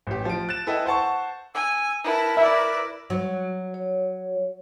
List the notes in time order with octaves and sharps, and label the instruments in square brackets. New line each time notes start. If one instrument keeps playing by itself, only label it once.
[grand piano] A1 G4
F3 D7
F#6 A6 E7
E4 A4 B4 D#5 G5
C5 F#5 A5 C#6
[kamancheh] G#5 [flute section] E6
[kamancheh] E4 A5 [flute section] A#4 B4
[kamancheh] E4 D5 [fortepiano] E5
[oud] F#3
[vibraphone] C#5